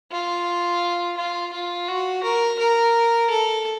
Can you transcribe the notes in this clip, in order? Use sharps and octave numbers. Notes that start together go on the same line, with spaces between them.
F4
F4
F4
F#4
A#4
A#4
A4